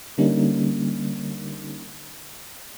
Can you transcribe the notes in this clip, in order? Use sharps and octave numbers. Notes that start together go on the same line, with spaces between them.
D3 G3 A#3 C#4 D#4